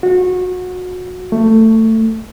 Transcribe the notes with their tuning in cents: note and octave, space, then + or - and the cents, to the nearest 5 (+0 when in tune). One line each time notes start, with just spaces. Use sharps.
F#4 -25
A3 +20